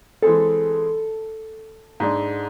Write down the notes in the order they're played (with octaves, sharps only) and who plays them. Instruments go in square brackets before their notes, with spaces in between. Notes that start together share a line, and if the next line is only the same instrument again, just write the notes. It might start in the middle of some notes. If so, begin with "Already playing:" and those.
[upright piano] E3 G#3 C4 G#4 [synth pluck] A4
[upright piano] G#2 G#3 D4